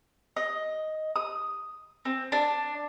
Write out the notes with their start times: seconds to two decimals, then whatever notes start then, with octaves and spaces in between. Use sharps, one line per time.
0.36 D#5
1.16 D#6
2.05 C4
2.32 D4